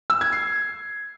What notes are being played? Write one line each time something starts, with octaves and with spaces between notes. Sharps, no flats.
E6
G#6
C7